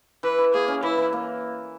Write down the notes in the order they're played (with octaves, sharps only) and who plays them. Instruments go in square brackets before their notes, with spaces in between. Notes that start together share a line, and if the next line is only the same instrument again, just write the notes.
[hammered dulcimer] E3 [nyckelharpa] B4
[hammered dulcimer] E3
[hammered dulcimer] A#3 [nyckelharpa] G#4
[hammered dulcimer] C#4
[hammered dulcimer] E3 [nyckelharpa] E4
[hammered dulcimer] E3
A#3